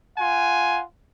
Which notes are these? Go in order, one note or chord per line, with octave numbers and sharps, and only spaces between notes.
F4 F#5 G#5